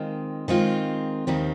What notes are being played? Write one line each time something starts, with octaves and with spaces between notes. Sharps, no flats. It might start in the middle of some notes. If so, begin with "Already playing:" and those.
Already playing: D#3 G#3 C4 F4
D#3 G#3 C4 F4
D#2 D#3 G3 C4